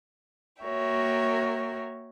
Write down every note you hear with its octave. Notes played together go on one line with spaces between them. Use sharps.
A#3 F#4 A#4 C#5 E5 G5